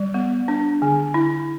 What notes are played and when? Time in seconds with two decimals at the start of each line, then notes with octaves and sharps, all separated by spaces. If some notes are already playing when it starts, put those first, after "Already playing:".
Already playing: G3 D5
0.14 B3
0.48 D4
0.82 D3
1.14 E4